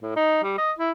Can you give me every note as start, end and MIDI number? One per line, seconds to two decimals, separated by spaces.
0.02 0.12 45
0.16 0.41 63
0.44 0.55 55
0.58 0.72 75
0.79 0.91 64